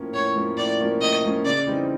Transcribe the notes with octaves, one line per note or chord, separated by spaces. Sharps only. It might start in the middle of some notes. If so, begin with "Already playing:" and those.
Already playing: A2 F3 A#3 C#4
A2 C#5
F3 A#3 C#4
A2 D5
F3 A#3 C#4
A2 D#5
F3 A#3 C#4
C#3 D5
E3 G3 C4 D#4